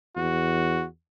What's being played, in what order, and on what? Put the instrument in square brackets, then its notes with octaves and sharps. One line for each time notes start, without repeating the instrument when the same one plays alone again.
[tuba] E2 [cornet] F#4